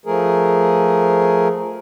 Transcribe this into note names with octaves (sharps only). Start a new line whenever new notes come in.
F3 A3 G#4 A#4